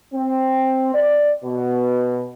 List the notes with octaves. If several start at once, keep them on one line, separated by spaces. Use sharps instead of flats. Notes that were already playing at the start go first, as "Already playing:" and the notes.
C4
D5
B2